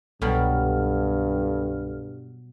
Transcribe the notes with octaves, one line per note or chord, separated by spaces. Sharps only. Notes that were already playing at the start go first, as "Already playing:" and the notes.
C2 G2 B2 F#3 G3 A4 F6